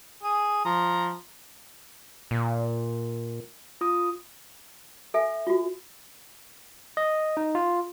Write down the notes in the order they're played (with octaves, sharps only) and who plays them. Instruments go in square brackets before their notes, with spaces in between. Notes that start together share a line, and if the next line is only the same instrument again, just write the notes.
[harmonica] G#4 D#6
F3 A#5
[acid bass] A#2
[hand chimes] F4 D#6
[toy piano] A4 E5 G#5
F4 F#4
[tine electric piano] D#5
D#4
F4